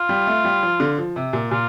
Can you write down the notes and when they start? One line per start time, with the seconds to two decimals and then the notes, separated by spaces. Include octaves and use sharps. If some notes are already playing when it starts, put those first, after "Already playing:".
Already playing: F4
0.09 G3
0.27 A3
0.45 G3
0.63 F3
0.80 D3
0.98 F3
1.16 C3
1.33 A#2
1.51 A#2 F4